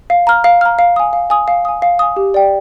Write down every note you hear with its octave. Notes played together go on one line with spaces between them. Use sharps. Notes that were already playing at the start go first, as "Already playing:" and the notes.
F5
A#5 F6
F5
A#5 F6
F5
G#5 D#6
F5
G#5 D#6
F5
G#5 D#6
F5
G#5 D#6
G4
D5 G5